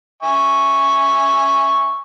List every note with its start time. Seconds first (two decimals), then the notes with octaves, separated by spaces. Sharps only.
0.23 E5 G#5 C#6